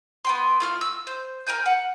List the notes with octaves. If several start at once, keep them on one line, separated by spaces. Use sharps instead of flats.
B3 G5 C6
A3 F4 F6
E6
C5
A#4 G5 G#5 G6
F#5